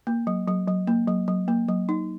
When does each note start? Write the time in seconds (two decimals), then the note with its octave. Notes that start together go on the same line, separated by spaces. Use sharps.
0.07 A#3
0.27 F#3
0.48 F#3
0.68 F#3
0.87 A#3
1.08 F#3
1.28 F#3
1.48 A#3
1.68 F#3
1.89 D#4